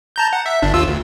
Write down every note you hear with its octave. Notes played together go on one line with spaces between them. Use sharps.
A5 A#5 G6
F#5
E5
G1 D4
D#2 F4 E6
D2